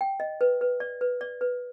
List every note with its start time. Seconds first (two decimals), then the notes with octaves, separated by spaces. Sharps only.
0.01 G5
0.20 D#5
0.41 B4
0.61 B4
0.80 D5
1.01 B4
1.21 D5
1.41 B4